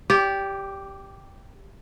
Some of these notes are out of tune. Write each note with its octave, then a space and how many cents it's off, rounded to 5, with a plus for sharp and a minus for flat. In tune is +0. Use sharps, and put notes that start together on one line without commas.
G4 +0 D5 -30